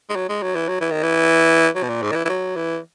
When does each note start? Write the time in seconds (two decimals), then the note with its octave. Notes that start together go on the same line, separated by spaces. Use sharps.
0.10 G#3
0.16 F#3
0.29 G#3
0.43 F#3
0.55 E3
0.68 F#3
0.81 E3
0.91 D#3
1.03 E3
1.76 F#3
1.83 B2
1.89 A#2
2.02 G#2
2.12 D#3
2.15 E3
2.25 E3
2.29 F#3
2.56 E3